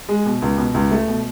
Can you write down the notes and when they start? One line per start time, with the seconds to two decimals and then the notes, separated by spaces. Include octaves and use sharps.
0.09 G#3
0.26 B2
0.42 C#2
0.58 B2
0.74 C#2
0.91 A3
1.08 B2